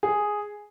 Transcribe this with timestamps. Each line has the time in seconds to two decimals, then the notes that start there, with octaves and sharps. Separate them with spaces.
0.03 G#4